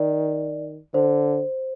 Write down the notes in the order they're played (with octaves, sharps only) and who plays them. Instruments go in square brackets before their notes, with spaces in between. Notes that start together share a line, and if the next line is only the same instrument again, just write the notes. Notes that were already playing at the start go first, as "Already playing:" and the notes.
Already playing: [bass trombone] D#3 [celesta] D5
[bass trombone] D3 [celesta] C5